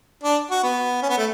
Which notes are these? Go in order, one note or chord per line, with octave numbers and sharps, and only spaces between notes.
D4
F#4
B3
C#4
B3
A3